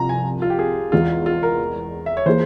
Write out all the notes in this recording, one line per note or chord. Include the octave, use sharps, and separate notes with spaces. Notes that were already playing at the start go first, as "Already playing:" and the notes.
Already playing: C2 C3 F3 A#5
G#5
F4
G4
G#4
E2 E3 G#3 F4
F4
A#4
E5
C#5
E3 A#3 F4 G#4 C5